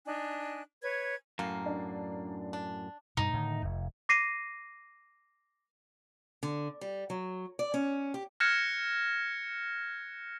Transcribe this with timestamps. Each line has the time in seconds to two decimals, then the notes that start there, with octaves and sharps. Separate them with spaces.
0.06 D4 D#4 G#5 F#6
0.82 B4 C#5 G#6
1.39 F#2 A2 A#3
1.66 D4
2.53 D4
3.17 G2 B2 D#4
3.33 A2 D3 D#3
3.62 F1 F2
4.09 D6 A#6 C7 D#7
6.43 D3
6.81 G3
7.10 F#3
7.59 D5
7.74 C#4
8.14 G4
8.40 F6 F#6 G#6 A#6 C#7 E7